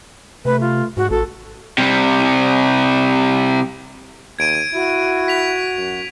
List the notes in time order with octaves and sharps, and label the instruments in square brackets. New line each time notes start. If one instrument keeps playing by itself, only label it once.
[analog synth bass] C3 [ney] A3 [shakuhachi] B4
[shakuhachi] F4
[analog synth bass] G#2 [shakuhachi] F#4
[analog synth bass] A1 [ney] F#4 [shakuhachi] A4
[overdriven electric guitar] C3 G3
[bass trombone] D#2 [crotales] G#6 D7 D#7
[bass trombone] E4 [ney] F#4
[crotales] B6 F7
[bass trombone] F#2